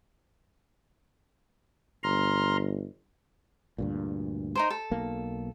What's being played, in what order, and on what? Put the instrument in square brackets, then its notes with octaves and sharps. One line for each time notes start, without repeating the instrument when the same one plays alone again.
[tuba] G1 [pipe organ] A#5 C6 F6
[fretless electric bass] D2 G2 A#2
[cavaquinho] D#4 A#4 C5
A4
[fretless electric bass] B1 A#3